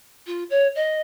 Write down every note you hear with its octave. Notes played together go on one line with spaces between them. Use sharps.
F4
C#5
D#5